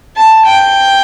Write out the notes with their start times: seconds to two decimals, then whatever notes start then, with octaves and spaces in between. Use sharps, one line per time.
0.17 A5
0.46 G5